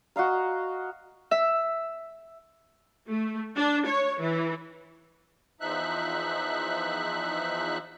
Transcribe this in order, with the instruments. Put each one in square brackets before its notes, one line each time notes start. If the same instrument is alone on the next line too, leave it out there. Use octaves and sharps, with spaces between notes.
[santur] F#4 D#5 F5 A#5
[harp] E5
[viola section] A3
D4
C#5
E3
[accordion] E2 F3 D#4 E5 F#6